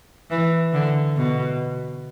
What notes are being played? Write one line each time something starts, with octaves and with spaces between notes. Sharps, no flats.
E3
D3
B2